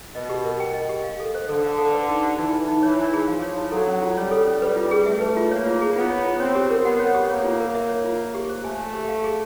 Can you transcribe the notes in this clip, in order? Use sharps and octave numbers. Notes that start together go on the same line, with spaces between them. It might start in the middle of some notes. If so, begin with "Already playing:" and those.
B2 D#5
G4
A#4
G5
D#5
G4
F5
A4
C5
D3 A4
F5
A4
B4
D#4
G4
E3 D#4
B4
D#4
E3 C#5
E4
G#4
F3 F5
C#5
E4
F#3 A4
C#4
F4
G3 C#5
A4
C#4
G3 B4
F4
G#4
A3 E5
B4
F4
A#3 C#5
F4
G#4
B3 F4
C#5
F4
C4 C#5
G4
A#4
B3 F#5
C#5
G4
A#3 C#5
F4
A#4
E5
C#5
F4
E5
G4
C5
A3 G#5
E5
G4
F5
G#4